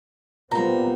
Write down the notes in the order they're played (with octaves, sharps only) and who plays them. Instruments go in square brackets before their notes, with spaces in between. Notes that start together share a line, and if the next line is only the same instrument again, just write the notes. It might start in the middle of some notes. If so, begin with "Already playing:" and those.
[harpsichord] A#2 [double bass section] G3 B3 C4 [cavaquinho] A#5